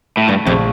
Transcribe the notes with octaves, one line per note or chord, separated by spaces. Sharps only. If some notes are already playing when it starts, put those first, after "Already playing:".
A2
G2 A3
A#1 F2